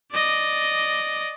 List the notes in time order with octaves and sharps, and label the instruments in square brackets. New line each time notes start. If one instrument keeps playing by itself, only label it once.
[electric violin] D5 D#5